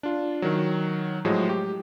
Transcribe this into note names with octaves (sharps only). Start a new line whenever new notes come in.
D4 F4
D#3 F#3
A2 F3 F#3 G#3
G4